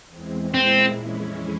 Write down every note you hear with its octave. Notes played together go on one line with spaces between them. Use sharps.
E2 E3 G#3 C4
A#2 G#3 C4 E4
F2 E3 G#3 C#4 E4